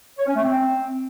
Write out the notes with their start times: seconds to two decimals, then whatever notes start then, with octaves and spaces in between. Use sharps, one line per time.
0.18 C#5
0.27 C#4
0.35 A3
0.44 C4